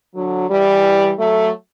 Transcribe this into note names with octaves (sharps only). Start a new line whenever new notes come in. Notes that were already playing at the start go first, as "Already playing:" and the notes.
D3 F#3
E3 G3
F#3 A3